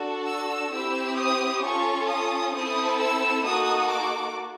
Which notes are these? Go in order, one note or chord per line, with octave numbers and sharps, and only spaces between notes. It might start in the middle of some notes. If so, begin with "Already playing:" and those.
Already playing: D4 F#4 A4
E6
C4 E4 G4 E6
D#6
C#4 F4 A4 C#6
D#6
C4 E4 A4 D#6
E6
A#3 D#4 F#4 A4 D#6
D6